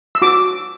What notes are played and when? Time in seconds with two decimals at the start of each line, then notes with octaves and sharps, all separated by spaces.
0.15 E6
0.22 F#4 D6